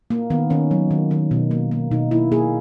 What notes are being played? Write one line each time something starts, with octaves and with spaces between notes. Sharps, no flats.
A#3
D#3 B3
D#3 C#4
F#3
D#3
D#3
B2
A#3
A#3
B2 D#4
A#3 E4
A#3 G#4